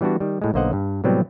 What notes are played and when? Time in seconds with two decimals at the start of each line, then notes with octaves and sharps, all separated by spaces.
0.01 E3 G3 B3 D4 F#4
0.20 D#3 G3
0.42 A2 G#3
0.54 B1 D3 A#3 C5 D#5 F#5
0.73 G2
1.04 A2 C3 F#3 G3 B3 C4